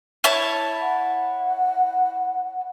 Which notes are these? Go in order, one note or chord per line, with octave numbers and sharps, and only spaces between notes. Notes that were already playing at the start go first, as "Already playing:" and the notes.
E4 C#5 A5
F#5